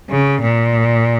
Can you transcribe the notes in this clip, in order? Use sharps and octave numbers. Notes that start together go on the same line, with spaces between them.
C#3
A#2